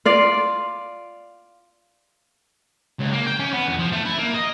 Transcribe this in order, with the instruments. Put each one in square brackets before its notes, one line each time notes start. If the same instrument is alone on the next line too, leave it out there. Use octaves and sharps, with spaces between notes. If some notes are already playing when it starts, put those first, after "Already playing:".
[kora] F4 D5 F5
[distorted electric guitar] C#2
A#3
G5
C#4
B3
E2
F3
A3
E4
A#3
D#5